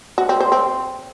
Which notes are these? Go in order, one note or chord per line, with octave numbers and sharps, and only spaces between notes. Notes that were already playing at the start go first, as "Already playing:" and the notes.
F#4
C4
C5
C4